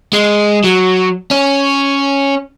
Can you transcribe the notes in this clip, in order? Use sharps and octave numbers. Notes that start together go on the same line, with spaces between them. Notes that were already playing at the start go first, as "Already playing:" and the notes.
G#3
F#3
C#4